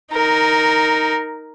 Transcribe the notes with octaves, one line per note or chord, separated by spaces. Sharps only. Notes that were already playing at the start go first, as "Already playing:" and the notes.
D#4 A#4